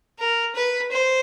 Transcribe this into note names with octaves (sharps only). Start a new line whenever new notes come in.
A#4
B4
C5